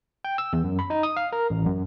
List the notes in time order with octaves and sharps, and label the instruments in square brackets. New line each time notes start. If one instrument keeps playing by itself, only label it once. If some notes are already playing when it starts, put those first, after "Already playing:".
[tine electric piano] G5
E6
E2
F#2
B5
D#4
D#6
F5
A#4
A1
F#2